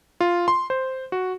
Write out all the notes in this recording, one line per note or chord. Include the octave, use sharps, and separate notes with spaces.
F4
C6
C5
F#4